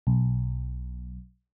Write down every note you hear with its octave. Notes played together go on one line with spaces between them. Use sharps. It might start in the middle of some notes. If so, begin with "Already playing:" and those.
B1